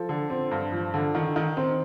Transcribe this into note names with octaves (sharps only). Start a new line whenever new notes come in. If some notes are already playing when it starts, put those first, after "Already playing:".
Already playing: F3 A4
D3
C4
G2
F3
D3
D#3
D#3
C4